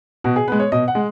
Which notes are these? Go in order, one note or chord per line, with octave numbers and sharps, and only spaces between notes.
B2 F#4
G#4
G#3 B3 B4
C#5
B2 D#5
F#5
G#3